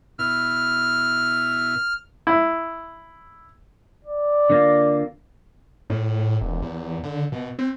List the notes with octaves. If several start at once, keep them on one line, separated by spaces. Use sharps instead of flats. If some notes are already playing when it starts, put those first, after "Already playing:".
B2 E4 F6
E4
D5
D3 A#3 F4
A2
E1
E2
D3
B2
C4